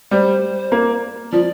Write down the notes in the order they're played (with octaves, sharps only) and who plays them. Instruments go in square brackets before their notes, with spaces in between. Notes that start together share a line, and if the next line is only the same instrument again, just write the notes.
[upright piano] G3 [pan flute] C5
[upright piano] A#3
[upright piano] F3 [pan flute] D5